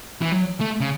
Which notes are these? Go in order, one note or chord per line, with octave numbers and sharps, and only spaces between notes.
E3
F#3
A3
C#3